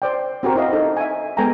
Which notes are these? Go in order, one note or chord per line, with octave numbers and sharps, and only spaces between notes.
C5 D5 G5
C4 F#4 G4 A#4 C5
E4 A#4 D#5 F5
D#4 A4
E5 G#5
G#3 B3 A4 G5 G#5 A#5